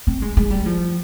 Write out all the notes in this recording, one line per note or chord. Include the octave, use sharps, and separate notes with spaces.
C4
G#3
G#3
G3
F3